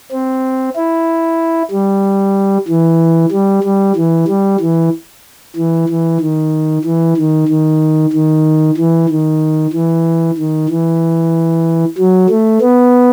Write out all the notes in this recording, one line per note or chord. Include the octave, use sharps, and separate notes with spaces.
C4
E4
G3
E3
G3
G3
E3
G3
E3
E3
E3
D#3
E3
D#3
D#3
D#3
E3
D#3
E3
D#3
E3
F#3
A3
B3